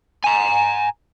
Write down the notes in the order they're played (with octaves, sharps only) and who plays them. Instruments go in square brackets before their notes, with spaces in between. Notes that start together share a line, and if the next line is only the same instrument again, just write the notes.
[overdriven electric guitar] G#5 A#5